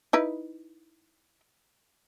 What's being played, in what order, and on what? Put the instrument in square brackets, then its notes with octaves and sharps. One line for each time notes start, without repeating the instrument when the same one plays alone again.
[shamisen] D#4 E4 B4